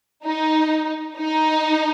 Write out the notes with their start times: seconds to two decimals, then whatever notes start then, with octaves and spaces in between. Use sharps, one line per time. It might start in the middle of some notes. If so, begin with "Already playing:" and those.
0.24 D#4
1.17 D#4